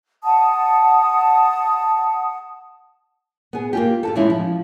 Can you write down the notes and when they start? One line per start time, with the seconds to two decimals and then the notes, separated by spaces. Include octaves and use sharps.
0.24 F#5 A5 D#6
3.53 B3 G#4
3.73 A#3 F4 G4
4.03 F4 F#4 A4
4.16 E3 G3 G#3 C#4 D#4 E4
4.30 F3